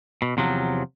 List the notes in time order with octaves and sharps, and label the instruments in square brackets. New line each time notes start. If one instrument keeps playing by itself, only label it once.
[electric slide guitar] B2
E2 C3 F3 F#3